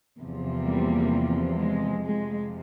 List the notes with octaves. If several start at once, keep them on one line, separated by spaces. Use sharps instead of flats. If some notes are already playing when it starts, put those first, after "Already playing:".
E2 C3 F3
G3 A#3
G#3
F2 C3 F3 G#3